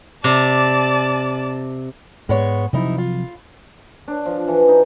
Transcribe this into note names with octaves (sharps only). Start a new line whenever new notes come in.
C3 D5 A5
G#2 G#3 B3 C#5
D2 C3 F3 F#3 D#4 E4
F4
D4
F3
E3
D#4